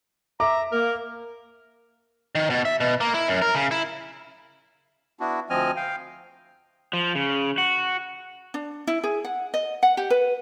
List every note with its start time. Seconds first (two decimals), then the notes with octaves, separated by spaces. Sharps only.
0.40 E5 A#5 D6
0.72 A#3 A#4
2.35 D#3
2.50 B2
2.65 E5
2.80 B2
3.01 A#3
3.14 E4
3.28 F#2
3.42 A#4
3.55 C#3
3.71 E4
5.20 B3 D4 E4 F#4
5.50 D2 F3 C4 D#5 G#5 F6
5.76 F5 G5
6.93 F3
7.15 C#3
7.58 F#4
8.54 D4
8.87 E4
9.04 G#4
9.24 F#5
9.54 D#5
9.83 F#5
9.97 G4
10.10 B4